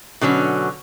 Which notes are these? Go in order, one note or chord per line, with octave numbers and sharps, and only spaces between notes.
B2 D3 F#3 C#4